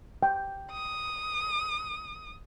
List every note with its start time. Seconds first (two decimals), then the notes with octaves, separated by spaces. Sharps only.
0.23 G5
0.72 D#6